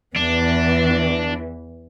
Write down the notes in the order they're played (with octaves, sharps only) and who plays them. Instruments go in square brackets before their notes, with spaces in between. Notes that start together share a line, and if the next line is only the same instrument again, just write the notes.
[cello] E2 E3 [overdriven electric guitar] D4